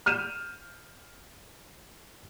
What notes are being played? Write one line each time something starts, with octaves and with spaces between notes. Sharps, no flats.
F6 G6 D#7 E7